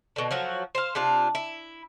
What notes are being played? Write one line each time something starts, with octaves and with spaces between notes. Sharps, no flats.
B2 D3
F3 F#3 F#4
C5 F5
C3 D4 F4
E4